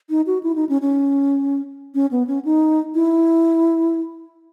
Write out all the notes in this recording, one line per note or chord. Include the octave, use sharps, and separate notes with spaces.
D#4
F#4
E4
D#4
C#4
C#4
C#4
B3
C#4
D#4
E4